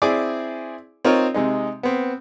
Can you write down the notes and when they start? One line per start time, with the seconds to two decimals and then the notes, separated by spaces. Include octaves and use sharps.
0.02 C4 E4 G#4 D5 G#5 D6
1.05 C4 D#4 F4 A#4 C#5
1.34 C3 G#3 D#4
1.83 B3 C4